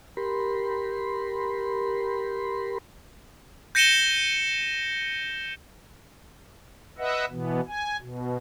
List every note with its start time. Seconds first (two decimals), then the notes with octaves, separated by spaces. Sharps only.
0.17 G4 A#4 B5 C6
3.75 G6 A#6 C#7 D#7 E7 G7
6.98 B4 D#5 E5 F#5
7.31 B2 E3 B3
7.68 G#5
8.00 B2